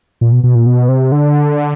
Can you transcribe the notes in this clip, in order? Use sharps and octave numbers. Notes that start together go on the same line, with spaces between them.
A#2
B2
B2
A#2
B2
C3
D3